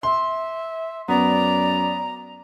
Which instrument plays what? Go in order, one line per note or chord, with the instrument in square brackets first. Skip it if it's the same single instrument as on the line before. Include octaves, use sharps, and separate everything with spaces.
[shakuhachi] E5 [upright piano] C6
[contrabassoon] F#2 [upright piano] B3 [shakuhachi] D5 [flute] A#5